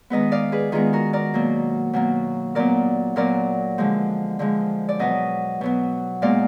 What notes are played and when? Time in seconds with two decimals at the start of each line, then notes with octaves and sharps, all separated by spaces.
0.10 D#3 G#3 B3 B4 D#5
0.32 D5 F5
0.52 G#4 B4
0.72 D#3 G#3 B3 F4 G#4
0.93 F#4 A#4
1.13 A#4 D5
1.34 B2 F#3 A#3
1.93 B2 F#3 A#3
2.55 A#2 F#3 B3 A#4 D5
3.16 A#2 F#3 B3 A#4 D5
3.78 D3 F3 G#3
4.39 D3 F3 G#3
4.89 D5
4.99 B2 F#3 B3 B4 D#5
5.61 B2 F#3 B3
6.22 A#2 G#3 B3 D5 F5